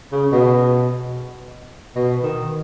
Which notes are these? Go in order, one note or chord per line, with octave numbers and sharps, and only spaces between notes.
C#3
B2
B2
D#3